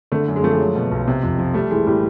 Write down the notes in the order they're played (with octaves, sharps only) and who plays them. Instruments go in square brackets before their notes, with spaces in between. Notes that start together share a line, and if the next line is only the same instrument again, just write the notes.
[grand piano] D3 [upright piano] A3
[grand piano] F#2
[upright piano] G#3
[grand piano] F3 [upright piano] A3
[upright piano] G#3
[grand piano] F#3
B2
B1
C3
F2
F3
[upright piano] G3 [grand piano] A3
[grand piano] E3 [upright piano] G#3
[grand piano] A2 [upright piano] G3